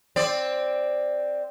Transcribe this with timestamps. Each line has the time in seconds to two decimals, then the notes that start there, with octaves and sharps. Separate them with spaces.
0.16 C4 D5